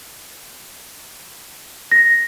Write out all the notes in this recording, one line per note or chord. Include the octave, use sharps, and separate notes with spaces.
A#6